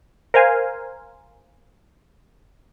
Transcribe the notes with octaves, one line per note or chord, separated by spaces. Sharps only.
A#4 C5 F5 G#5